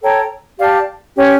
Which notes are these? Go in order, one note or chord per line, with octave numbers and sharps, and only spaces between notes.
A4 C#5 G5 A#5
G4 D5 F5 A5
C#4 G4 C#5